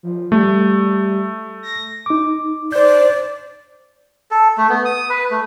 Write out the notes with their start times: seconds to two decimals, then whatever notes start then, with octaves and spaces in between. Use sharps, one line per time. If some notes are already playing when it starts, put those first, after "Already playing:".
0.03 F3
0.32 G3 A3
1.63 A#6
2.06 D#4 D6
2.72 C5 D5 G6
4.31 A4
4.57 A3
4.69 B3
4.85 D#6
5.10 B4
5.31 A3